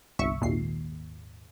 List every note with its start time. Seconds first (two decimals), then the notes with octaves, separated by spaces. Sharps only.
0.19 G1 C2 E5 C#6
0.41 G#1 D#2 A#2 C7